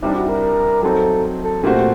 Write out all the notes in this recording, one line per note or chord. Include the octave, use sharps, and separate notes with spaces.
C2 C3 G3 D4 D#4
F#4
A#4
F#3 C4 D#4 A4
A4
A#2 A3 C4 F#4 G4 C5
G4